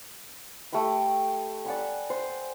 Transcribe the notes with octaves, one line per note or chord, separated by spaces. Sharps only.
A3 G4 G5 B5
D5 F#5 G#5 B5
C5